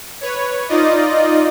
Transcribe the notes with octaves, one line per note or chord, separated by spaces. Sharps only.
B4 C#5
D#4 F4 D5 D#5